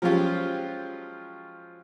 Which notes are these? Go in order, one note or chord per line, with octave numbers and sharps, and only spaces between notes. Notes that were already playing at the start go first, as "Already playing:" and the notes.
F3 F#3 G#3 C#4 F4 G4